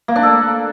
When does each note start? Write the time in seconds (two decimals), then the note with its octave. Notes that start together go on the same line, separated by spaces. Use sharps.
0.08 A#3
0.16 D4
0.23 A4